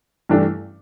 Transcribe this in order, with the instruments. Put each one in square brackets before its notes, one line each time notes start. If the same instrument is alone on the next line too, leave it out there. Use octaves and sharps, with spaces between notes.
[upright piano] G2 E3 A3 D4 G4